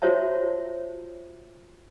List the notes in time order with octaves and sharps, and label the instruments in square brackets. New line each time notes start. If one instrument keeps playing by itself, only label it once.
[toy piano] F4 F#4 C5 C#5 E5 A5